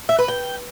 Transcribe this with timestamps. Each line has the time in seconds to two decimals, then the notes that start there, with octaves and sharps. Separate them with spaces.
0.09 E5
0.19 B4
0.28 G5